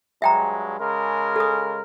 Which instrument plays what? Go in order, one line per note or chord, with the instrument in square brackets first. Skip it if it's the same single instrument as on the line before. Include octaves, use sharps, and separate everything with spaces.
[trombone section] G2 F#3 G#3 [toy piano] E5 G5 A#5
[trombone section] C#3 G#3 A#4
[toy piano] A4 D#6